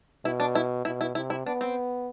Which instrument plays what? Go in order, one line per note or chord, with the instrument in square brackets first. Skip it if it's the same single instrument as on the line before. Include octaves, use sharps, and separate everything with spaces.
[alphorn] B2 [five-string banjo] E4
[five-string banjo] D4
E4
[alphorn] B2 [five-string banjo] E4
[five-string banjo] E4
[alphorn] C3 [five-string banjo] E4
[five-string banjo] E4
[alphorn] B3 [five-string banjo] D4
[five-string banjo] C4